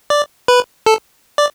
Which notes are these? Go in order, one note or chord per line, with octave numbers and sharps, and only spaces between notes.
D5
B4
A4
D5